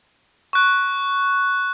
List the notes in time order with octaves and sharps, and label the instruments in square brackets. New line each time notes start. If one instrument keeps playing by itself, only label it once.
[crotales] C#6 F#6